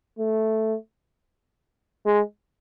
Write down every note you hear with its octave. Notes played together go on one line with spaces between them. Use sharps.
A3
G#3